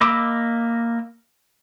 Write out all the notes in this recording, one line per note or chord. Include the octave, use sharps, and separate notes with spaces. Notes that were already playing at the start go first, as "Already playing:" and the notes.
A#3 D#5 B5 D6 E6